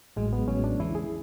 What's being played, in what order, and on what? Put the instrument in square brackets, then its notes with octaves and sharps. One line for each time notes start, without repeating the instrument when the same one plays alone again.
[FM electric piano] A1 A2 F#3 [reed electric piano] G#3
[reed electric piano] B3
[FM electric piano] A1 A2 F#3 [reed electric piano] C#4
[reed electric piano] D4
[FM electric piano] E2 C#3 E3 G#3 [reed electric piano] E4
[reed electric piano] G#4